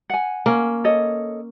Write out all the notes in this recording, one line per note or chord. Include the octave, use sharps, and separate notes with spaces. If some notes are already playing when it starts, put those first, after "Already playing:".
F#5 G#5
A#3 C#4
A4 C#5 D#5